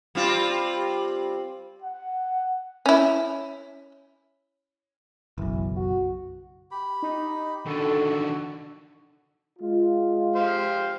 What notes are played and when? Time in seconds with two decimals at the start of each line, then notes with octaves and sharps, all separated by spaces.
0.15 G3 C4 F4
1.82 F#5
2.86 C#4 E4
5.38 F#1 B1 E3
5.77 F#4
6.71 G4 B5
7.02 D#4
7.66 D3 D#3 F#4 A4
9.59 G#3 F4
10.35 G4 C5 F5